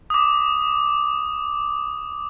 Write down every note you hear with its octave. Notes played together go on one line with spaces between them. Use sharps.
D6 D#6